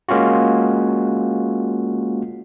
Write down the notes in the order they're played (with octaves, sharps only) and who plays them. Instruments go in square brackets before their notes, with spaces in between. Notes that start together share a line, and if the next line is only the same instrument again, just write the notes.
[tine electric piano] G#3 A#3 C#4 F4 F#4